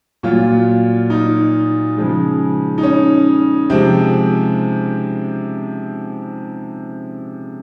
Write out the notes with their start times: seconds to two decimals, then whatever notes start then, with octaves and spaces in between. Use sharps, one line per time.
0.23 A#2 F#3 F4
1.10 D#4
1.97 C#3 F3 G#3
2.78 D#4
2.83 C#4
3.70 C3 F3 G#3 C4